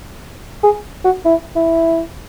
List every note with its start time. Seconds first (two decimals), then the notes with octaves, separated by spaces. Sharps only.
0.64 G#4
1.05 F#4
1.25 E4
1.56 E4